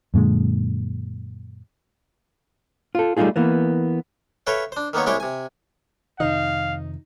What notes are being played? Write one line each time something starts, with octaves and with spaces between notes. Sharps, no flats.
F#2 A#2 D3 G#3
F4 A4
G3 A3 C#4 D#4 F4 G#4
E3 A#3 B3
A4 B4 C#5 E5 F5 G5
D4 C5
D#3 A#3 B3 D#4 C#5
C2 G#3 E4 C#5 G5 D6
C3 G#5
F2 C3 D#3 D#4 F5